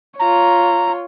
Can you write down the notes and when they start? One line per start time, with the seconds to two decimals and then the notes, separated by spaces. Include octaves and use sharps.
0.19 F4 C#5 A#5